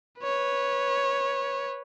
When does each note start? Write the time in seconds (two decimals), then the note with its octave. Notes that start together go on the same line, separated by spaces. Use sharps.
0.22 B4 C#5